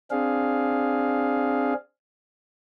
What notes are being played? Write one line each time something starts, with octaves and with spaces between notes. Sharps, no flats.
C4 D4 G#4 F5